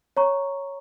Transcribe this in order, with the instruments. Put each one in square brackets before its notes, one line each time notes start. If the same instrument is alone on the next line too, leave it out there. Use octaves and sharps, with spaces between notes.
[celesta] C#5 A#5 C#6